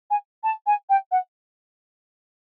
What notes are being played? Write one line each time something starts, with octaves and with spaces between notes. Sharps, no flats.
G#5
A5
G#5
G5
F#5